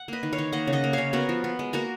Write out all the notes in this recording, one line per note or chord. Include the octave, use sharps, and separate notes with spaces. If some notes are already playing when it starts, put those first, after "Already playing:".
Already playing: F#5
A#3 B4 D#5
D#3
C#5 F5
D#3
A#3 D#5 F#5
C#3
D#5 F#5
A#3
C#3 C#5 F5
B3 F#4 A#4
F3
B3
G#3
A#3 F#4 A#4